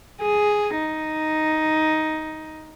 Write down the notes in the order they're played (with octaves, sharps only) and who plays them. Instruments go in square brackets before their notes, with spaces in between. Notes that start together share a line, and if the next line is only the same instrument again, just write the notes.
[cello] G#4
D#4